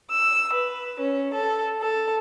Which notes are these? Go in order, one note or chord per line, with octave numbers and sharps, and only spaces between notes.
E6
B4
C#4
A4
A4